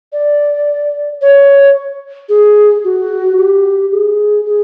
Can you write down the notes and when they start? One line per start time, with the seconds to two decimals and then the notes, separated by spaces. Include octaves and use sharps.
0.13 D5
1.22 C#5
2.29 G#4
2.84 F#4
3.37 G4
3.92 G#4
4.46 G#4